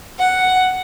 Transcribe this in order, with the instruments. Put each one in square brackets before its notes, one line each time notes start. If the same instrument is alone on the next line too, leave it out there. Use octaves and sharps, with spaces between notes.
[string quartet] F#5